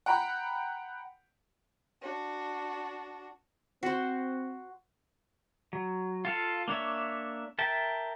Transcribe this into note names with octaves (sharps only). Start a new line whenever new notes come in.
F#5 G5 A#5 B5
D4 F#4
C4 F#4 C5
F#3
F4 A4 F5
A#3 D4 C#5 E5
A#4 E5 G5 A5